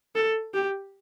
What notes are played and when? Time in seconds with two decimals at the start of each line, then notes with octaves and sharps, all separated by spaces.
0.15 A4
0.54 G4